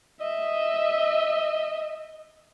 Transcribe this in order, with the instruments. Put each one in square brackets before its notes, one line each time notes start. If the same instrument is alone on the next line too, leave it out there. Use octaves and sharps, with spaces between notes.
[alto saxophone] D#5 [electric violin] E5